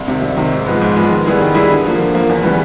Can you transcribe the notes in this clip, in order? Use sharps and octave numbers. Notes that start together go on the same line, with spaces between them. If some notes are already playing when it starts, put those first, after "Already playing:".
Already playing: C2
C3 D#3
C2
C3 D#3
G#2
F3 G#3 B3
G#2
F3 G#3 B3
D#3
G3 B3 E4 G#4
D#3
G3 B3 E4 G#4
D3
F3 A#3
D3
F3 A#3
E2
C#3 E3 G3 B3